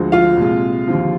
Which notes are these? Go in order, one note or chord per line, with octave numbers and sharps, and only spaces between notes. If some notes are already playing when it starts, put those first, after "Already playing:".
Already playing: D2 D3 F3 G#3
F4 F5
C2 A#2 G#3
D#2 D3 F3